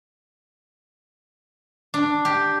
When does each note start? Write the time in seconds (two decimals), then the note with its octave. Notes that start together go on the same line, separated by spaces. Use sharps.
1.94 D4
2.25 G4